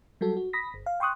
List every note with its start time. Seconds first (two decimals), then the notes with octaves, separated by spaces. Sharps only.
0.21 F#3 G3 F#4 A4
0.37 F#4
0.53 B5 D#6 A#6 B6
0.74 G1
0.86 F5
1.00 G5 C6 C#6 D#6 F#6